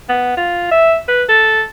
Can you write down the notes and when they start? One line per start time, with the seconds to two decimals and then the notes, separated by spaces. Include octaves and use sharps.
0.09 B3
0.37 F4
0.71 E5
1.08 B4
1.29 A4